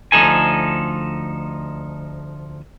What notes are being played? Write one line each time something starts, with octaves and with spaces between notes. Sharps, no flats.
D2 F3 D#4 A4 G#5